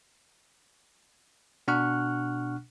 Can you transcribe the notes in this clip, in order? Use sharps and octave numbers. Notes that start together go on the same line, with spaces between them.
B2 D4 F#5 C#6 F6 F#6